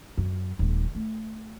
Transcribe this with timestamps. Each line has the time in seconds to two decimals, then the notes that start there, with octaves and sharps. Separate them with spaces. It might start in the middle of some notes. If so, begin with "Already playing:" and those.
0.18 F#2
0.59 D#1 G#3
0.95 A3